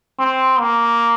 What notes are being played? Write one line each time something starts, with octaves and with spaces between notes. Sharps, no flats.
C4
A#3